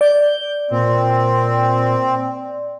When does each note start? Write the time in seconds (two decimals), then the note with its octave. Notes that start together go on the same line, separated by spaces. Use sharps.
0.01 D5 G6
0.71 A#2 C4